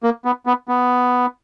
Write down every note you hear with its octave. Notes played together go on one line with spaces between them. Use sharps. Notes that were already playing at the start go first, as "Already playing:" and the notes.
A#3
B3
B3
B3